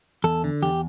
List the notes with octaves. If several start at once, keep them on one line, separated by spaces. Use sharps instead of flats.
E2 A4
D3
E2 G4